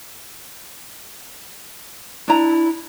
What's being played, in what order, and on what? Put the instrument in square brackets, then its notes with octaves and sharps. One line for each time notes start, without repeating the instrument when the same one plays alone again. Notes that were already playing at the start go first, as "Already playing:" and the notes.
[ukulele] D4 A#5 [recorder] E4